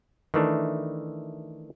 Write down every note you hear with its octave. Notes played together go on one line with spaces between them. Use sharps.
D#3 E3 A3 D4